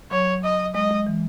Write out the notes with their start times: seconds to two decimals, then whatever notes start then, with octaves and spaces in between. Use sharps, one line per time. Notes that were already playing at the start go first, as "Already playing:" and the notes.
0.11 F#3 C#5
0.44 D#5
0.75 G#3 D#5
0.91 G#3
1.07 E3